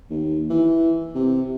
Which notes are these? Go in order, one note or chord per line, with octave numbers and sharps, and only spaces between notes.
D#2
E3
C3